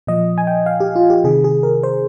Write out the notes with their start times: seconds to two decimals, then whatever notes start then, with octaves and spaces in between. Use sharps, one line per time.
0.07 A#2 F3 D#5
0.38 G#5
0.47 G5
0.66 F5
0.80 G4
0.96 F4
1.10 G4
1.24 C3 D#3 G#4
1.44 G#4
1.63 A#4
1.83 C5